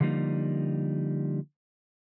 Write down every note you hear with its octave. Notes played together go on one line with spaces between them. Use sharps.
D3 F3 G3 A#3 D#4